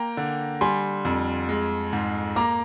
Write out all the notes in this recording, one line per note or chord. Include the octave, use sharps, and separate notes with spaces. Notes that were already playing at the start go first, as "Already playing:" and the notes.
Already playing: A#3 G5 A#5
D3
G3 G#5 C6
F2
G#3
G#2
A#3 A#5 D6